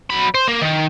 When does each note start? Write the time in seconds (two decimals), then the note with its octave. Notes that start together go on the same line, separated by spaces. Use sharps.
0.10 F#3 B5
0.34 C5
0.48 A#3
0.61 D#3